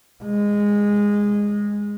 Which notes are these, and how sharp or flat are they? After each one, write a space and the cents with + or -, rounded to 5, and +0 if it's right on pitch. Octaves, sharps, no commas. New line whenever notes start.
G#3 -15